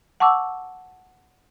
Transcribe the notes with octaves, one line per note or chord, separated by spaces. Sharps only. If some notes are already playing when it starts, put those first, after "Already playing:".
F#5 A5 C#6 D6 E6